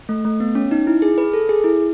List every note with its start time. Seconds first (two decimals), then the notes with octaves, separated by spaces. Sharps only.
0.09 A3
0.25 A3
0.40 B3
0.55 C#4
0.71 D#4
0.87 E4
1.02 G#4
1.18 B4
1.33 A4
1.49 G#4
1.64 E4